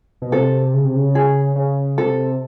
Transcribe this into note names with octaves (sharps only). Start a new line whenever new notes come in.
B2
C3 A4
C#3
C3
C#3
G#4
C#3
C3 A4